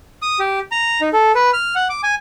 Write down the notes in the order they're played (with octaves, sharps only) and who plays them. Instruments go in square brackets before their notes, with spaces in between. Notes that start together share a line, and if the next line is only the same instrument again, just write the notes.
[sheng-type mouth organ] D#6
G4
A#5
D#4
A4
B4
F6
F#5
D6
G#5